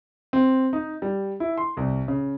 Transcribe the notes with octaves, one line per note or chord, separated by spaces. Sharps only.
C4
D#4
G3
E4
C6
C2
C#3